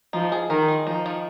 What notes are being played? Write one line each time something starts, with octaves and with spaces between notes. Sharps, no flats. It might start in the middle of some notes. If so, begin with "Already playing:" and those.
F3 D#4
G#4
D#3 A#4
G#3
F3 D#4
D#3